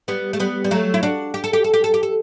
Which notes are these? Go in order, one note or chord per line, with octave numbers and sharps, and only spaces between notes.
G3 B3
A3
G3 B3
G3
F#3 A3
E4
D4 F#4
G4
A4
G4
A4
G4
A4
G4
A4